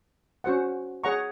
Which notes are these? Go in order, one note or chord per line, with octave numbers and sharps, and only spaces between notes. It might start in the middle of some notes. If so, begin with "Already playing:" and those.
C#4 F#4 C5 F#5
G#4 C#5 F#5 A#5 C#6